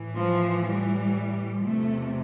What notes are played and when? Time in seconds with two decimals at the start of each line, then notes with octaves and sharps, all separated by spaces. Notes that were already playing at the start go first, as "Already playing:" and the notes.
Already playing: A2 E3
0.16 F3
0.66 G3
1.65 E2 C3 F3 A3